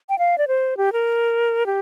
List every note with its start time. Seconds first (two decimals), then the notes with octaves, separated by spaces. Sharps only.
0.09 G5
0.19 F5
0.38 D5
0.48 C5
0.77 G4
0.93 A#4
1.66 G4